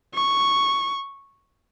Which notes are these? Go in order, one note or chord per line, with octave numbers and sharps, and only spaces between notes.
C#6